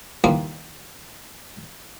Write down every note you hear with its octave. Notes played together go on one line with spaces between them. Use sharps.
D#2 E3 G3 A#3 F4 C#6